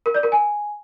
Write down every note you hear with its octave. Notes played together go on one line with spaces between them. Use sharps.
A#4
D5
A#4
G#5